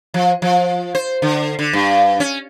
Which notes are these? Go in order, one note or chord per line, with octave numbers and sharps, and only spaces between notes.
F3
F3
C5
D3
D3
G2
C#4